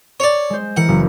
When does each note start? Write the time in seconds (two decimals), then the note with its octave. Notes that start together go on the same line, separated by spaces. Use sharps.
0.20 C#5 D5
0.50 G#3 C5
0.77 E3 A#4 F#5
0.88 F#1